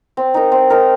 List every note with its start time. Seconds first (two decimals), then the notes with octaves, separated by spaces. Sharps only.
0.17 C4
0.34 D#4 A#4
0.52 C4
0.70 D#4 A#4